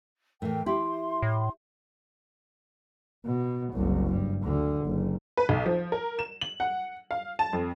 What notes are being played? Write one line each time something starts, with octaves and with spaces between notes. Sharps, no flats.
A2 E3 A#4 G5
E4 G4 C6
A2
B2
F#1 C2
G2
D2 D3
F#1
B4
B1
F3
A#4
E7
F#7
F#5
F5
A5
F2